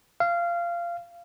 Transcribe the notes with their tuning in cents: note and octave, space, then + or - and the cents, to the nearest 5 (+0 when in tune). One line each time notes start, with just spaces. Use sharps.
F5 -20